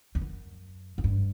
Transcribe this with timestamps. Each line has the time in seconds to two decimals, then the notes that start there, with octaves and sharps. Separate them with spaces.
0.15 E2
0.21 F#2
0.98 F#2
1.04 G2